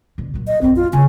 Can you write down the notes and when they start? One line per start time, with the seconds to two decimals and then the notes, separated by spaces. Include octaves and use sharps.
0.18 B2 D3
0.34 A#2 F#3
0.47 D#5
0.61 A#1 F#2 C4
0.76 F4
0.93 C#3 A#3 G#5